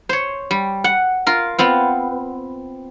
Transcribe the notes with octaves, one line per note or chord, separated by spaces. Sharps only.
C5 C#5
G3
F#5
F4 A#4
B3 C4 F4